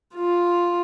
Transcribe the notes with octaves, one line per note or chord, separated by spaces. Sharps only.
F4